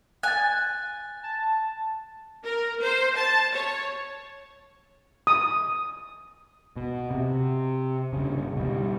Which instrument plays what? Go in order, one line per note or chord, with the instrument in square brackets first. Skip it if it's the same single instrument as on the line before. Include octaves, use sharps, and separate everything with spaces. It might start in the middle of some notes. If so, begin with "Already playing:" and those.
[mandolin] G#5 [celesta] F#6 A6
[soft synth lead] A5
[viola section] A#4
C5
A5
C#5
[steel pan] D#6
[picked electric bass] B2
C3
G2 C#3
B2 G3